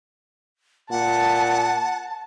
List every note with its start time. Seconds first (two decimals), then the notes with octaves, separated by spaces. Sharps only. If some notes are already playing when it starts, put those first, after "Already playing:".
0.91 A#2 F#5 A5